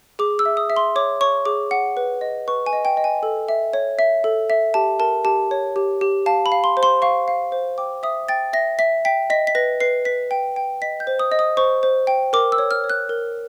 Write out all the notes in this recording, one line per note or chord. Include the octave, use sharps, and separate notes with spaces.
G#4 D6
E6
E5
D#6
E5
C6
C#5 D6
C#5 C#6
G#4 D6
F#5
B4
D#5
B4 C#6
G#5
D#5
G5
D#5
G#5
A4
E5
C#5
E5
A4
E5
G4 A5
A#4 A5
G4 A5
C#5
G4
G4
F5 A5
B5
F5
C6
C5
C6
F5 C#6
F5
C5
G5 D6
E5 D#6
G5 A6
E5 A#6
E5 B6
G5 B6
D#5 B6
B6
B4 A#6
B4 C7
B4 B6
G5
G5
D#5 B6
G6
C5
D#6
D#5
D#6
C5 C#6
C5
G5
A#4 D6
E6
C#5
F6
C#5
F#6
A#4